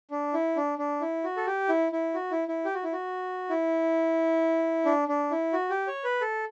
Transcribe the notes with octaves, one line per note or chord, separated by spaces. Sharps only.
D4
E4
D4
D4
E4
F#4
A4
G4
E4
E4
F#4
E4
E4
G4
F#4
E4
F#4
E4
D4
D4
E4
F#4
G4
C#5
B4
A4